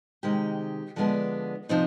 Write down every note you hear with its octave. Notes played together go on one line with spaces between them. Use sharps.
C3 D#3 G#3 G4
D3 F3 G#3 B3 D4
C3 F3 C4 D#4